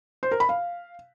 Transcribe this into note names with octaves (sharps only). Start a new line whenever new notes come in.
C5
A#4
B5
F5